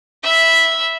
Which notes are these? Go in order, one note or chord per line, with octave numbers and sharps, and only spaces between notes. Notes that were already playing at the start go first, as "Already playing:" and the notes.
E5 B5